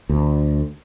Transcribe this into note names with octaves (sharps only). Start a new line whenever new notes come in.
D2